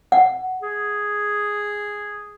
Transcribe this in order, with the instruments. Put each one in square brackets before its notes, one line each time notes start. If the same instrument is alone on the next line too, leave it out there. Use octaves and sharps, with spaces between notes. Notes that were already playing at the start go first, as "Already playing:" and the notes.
[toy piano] F#5
[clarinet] G#4